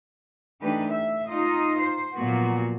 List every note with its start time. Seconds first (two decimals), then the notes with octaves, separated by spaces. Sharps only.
0.61 E3 A3 D4 D#4 G4 B4
0.91 E5
1.28 D#4 F4 D#5
1.78 C5
2.14 A#2 F3 F#3 A#3 B3 F#4